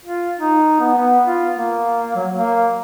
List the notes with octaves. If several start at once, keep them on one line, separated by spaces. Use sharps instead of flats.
F4
D#4
B3
B3
F4
A#3
F#3
A#3